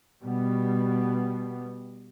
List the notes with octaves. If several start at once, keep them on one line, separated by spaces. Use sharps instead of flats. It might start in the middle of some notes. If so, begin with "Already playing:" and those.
B2 G3 B3